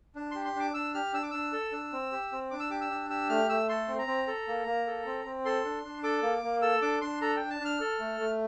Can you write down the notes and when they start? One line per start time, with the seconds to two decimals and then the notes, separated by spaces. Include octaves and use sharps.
0.16 D4
0.31 G4 C6
0.45 C6
0.56 D4 D6
0.74 D4 E6
0.94 G4 F6
1.14 D4 E6
1.23 D6
1.31 D4 E6
1.53 A4
1.72 D4
1.93 C4
2.12 G4
2.32 C4
2.51 D4 D6
2.60 E6
2.70 G4 D6
2.81 E6
2.90 D4
3.09 G4 E6
3.29 A3 F6
3.49 A3 E6
3.69 A4 C6
3.88 C4
3.98 A#5
4.07 C4
4.27 A4
4.47 A#3
4.66 A#3
4.87 A4
5.06 C4
5.25 C4
5.45 A4 C6
5.65 D4
5.85 D4
6.03 A4 D6
6.23 A#3
6.43 A#3
6.62 A4 E6
6.82 D4 D6
7.01 D4 C6
7.21 A4 A#5
7.36 D4 G5
7.50 A5
7.60 D4
7.65 F6
7.80 A4
8.00 A3
8.20 A3